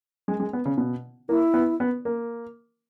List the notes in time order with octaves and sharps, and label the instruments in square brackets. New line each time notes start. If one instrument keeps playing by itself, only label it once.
[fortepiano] G#3
G#3
B3
C#3
B2
[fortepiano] A#3 [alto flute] E4
[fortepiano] B3
B3
A#3